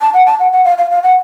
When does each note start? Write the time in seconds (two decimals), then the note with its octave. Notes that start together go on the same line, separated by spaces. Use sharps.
0.01 A5
0.14 F#5
0.26 A5
0.39 F#5
0.53 F#5
0.65 F5
0.78 F5
0.90 F5
1.03 F#5